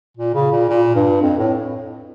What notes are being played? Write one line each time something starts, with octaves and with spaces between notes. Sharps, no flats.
A#2
C#3
A#2
A#2
G2
F2
A2